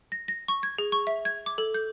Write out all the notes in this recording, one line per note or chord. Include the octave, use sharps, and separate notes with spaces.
A#6
A#6
C#6
G#6
G#4
C#6
E5
G#6
D6
A4
G6